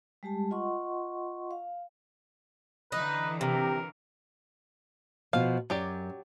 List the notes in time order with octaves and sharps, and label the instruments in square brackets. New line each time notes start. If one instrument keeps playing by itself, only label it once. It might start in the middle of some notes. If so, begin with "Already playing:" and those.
[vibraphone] G3 G#3 G4 A5
F4 D#5 F#5 C6 C#6
F5
[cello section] D3 E3 [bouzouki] D#4 [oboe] B4
[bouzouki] C3 [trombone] G4 [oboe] A#4
[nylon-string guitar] B2 F3 [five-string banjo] F5
[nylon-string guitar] F#2 [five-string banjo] F#3 G4 D5